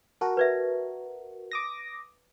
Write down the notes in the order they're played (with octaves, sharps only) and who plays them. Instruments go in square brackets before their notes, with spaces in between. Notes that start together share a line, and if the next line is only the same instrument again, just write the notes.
[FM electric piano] F#4 A#4 [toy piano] A5
[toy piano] B4 D5 E5
[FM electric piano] D6 D#6 A#6